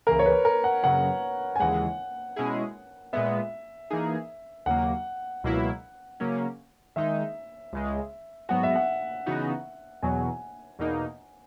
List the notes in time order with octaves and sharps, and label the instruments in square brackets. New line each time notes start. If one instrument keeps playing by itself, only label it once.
[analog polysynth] C#2 C#3 E3 A#3 [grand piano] A#4
[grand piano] C#5
B4
A#4
F#5
[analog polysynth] F#2 C#3 F#3 [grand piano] F#5
[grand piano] G#5
[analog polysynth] D#2 C#3 E3 G#3 [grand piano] F#5
[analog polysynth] B2 G#3 C#4 E4 G#4
[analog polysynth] A#2 G#3 B3 [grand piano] E5
[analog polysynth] E3 A#3 D#4 G#4
[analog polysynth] D#2 C#3 F#3 A#3 [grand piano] F#5
[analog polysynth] C#2 B2 F#3 A#3 E4
C#3 F#3 A#3 C#4
[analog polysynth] D#3 G#3 D#4 [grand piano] E5
[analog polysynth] C#2 C#3 G#3
[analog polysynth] G#2 F#3 B3 F#4 [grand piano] F#5
[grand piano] E5
F#5
[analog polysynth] C#3 E3 B3 D#4 F#4
[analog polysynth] E2 B2 F#3 [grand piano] G#5
[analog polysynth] E2 B2 A#3 D#4